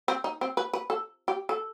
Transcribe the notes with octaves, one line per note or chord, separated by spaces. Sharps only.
C4
D#4
C4
B4
B4
A4
G4
A4